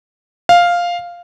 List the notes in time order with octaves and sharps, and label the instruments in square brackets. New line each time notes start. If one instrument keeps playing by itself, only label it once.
[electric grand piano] F5